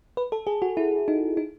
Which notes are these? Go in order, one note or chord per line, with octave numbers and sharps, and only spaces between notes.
B4
A4
G#4
F#4
E4
D#4
D#4